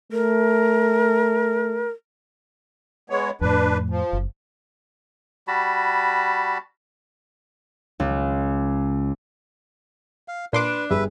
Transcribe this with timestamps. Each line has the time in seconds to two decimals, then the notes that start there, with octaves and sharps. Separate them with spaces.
0.12 A3 A#4
3.10 G#3 B3 C#5
3.41 F2 A2 D4 B4
3.90 F3
4.13 F#1
5.48 G3 F#4 A5 B5
8.00 C#2
10.28 F5
10.53 A#2 D4 B4 C6 D6
10.90 G1 G3 G#4 B4 E5